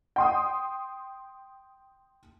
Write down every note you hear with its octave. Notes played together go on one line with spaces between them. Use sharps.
G5 C6 D#6